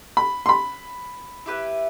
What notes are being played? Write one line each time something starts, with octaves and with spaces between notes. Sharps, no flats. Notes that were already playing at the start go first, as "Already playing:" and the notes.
B5
C6
B5
E4 G4 B4 E5